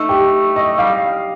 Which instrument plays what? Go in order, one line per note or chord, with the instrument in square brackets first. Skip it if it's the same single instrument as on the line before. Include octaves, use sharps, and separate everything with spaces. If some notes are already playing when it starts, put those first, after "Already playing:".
Already playing: [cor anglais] A3 [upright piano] D#4
[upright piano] G4
D#5
[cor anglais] G3 [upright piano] F5